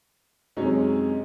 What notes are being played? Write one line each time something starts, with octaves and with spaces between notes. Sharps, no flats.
F#2 C3 G#3 C#4 D#4